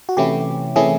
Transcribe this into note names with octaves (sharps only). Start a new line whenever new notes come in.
F#4
C3 E3 A3 C#4 E4 G4
C3 E3 A3 C#4 E4 G#4